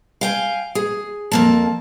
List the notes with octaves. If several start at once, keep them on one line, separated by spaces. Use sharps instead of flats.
F5 G5 G#5
G#4
F2 A#3 A5